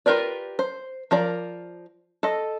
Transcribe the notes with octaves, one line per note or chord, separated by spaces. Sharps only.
F4 G4 A#4 B4 D5
C5
F3 A#4 D5
A4 D#5